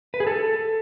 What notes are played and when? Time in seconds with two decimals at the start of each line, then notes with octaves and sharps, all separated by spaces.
0.14 B4
0.20 G#4
0.27 A4